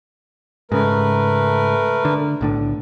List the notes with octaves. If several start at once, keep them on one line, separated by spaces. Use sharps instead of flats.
G#2 C#3 A3 A#4 B4
D3
B1 A2 D3